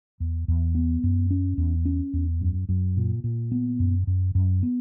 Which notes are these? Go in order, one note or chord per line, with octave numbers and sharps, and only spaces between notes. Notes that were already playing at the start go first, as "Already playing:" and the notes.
E2
E2
B3
F#2
C#4
E2
C#4
E2
F#2
F#2
A#2
A#2
B3
F#2
F#2
F#2
B3